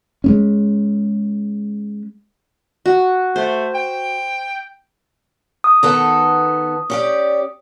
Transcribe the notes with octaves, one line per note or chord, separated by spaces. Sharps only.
G#3 B3 C#4
F#4
A3 C5
G5
D#6
D#3 B3 A4
C#4 G4 D5